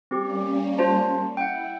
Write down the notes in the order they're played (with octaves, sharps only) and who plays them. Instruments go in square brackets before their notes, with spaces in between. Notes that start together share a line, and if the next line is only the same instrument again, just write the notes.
[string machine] G3 A#3 C#4 [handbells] C4 G4
[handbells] F4 C5 A5
[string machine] E4 [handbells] F#5 G5